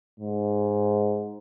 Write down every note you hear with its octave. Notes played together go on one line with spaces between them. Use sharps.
G#2